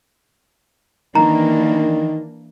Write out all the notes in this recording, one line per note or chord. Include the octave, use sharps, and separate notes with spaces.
D#3 E3 A#3 D4 A#5